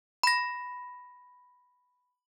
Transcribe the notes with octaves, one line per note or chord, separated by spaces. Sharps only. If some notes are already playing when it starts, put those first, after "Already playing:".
B5 A#6